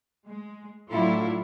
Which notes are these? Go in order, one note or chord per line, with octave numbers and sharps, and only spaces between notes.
G#3
A2 F#3 D4 E4 F4 A4